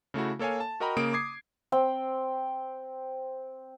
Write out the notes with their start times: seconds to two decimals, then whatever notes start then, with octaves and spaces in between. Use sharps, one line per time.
0.14 C#3 A3 E4 F#4
0.39 A#3 A4 C#5 F5 G#5
0.60 A5
0.80 F#4 A#4 D#5 G5 A#5 B5
0.97 C#3 A#3 D#6 D7
1.13 D6 D#6 G#6 C7
1.72 C4 G5